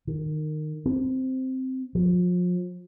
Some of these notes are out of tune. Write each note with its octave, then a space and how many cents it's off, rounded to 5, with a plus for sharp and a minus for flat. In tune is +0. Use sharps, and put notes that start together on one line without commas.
D#3 -20
C4 -5
F3 +35